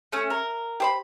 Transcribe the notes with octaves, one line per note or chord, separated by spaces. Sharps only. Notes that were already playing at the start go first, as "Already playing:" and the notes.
A3 C#4
A#4
G4 C5 B5